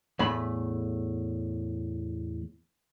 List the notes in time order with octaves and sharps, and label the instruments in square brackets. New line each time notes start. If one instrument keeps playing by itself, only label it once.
[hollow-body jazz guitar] E2 A2 A3 B5